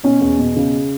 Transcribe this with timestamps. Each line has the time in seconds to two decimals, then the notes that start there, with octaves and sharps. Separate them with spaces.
0.03 B2 C#4
0.21 E2
0.39 B2
0.56 C#3